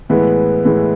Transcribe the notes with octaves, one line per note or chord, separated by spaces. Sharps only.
A2 E3 G#3 B3
A2 E3 G#3 B3